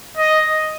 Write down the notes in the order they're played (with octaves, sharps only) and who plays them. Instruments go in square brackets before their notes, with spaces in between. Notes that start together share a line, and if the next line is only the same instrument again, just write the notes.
[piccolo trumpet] D#5